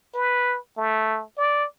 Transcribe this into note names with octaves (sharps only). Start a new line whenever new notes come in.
B4
A3
D5